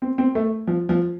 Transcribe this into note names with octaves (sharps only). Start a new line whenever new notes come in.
C4
C4
A3
F3
F3